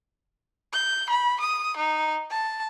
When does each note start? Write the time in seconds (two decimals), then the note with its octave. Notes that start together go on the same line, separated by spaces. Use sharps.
0.73 G6
1.10 B5
1.41 D#6
1.77 D#4
2.31 A5